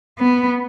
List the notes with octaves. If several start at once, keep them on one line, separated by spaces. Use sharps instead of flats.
B3